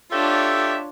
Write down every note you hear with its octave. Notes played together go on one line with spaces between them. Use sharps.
D4 F4 G4 A4 C#5 E5